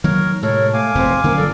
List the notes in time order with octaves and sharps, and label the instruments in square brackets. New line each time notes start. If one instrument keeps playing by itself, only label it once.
[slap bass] D#3 F#3 A#3 [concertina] A#4 C#5
[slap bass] A2 C3 G#3 [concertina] A4 A#4 [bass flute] C#5
[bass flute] A3 [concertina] F5 G#5 D6
[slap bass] F1 E2 B2 [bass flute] C4
[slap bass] D3 F#3 C#4 [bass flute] A#3
[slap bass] G1 F3 [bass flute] A4 [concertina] A#4 D5